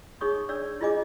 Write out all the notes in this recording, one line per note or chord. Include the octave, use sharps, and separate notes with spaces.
D#4 G#4 C#5 C#6 D#6
D4 C#5 D5 E6
E4 F4 G#4 D#5 G#5 D6